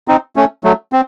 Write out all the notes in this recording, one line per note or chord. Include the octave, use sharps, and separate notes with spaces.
C4 D#4
A3 C#4
F#3 A3
C4